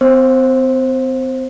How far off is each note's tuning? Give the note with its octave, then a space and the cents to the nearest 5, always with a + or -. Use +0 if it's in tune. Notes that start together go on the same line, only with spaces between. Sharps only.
C4 -40 C5 +15